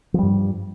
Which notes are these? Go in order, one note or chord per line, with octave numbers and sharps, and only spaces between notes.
G2 F3 G3